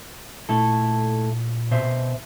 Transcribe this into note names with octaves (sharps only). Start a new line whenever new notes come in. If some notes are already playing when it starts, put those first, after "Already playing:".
A#2 A3 E4 A4
B2 C5 E5